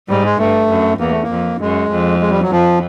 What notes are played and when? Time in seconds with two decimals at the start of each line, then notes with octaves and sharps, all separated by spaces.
0.09 G#2 G3
0.25 G#3
0.39 G2 A3
0.70 F#2
1.00 E2 A#3
1.11 A3
1.23 A#3
1.31 F2
1.61 F#2 G#3
1.91 F2
2.21 G#3
2.31 G3
2.42 F#3
2.52 F2 F3